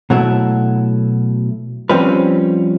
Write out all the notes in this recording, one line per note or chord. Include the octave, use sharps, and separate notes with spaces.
B2 F#3 A3 E4
F3 G3 C4 C#4 F4 B4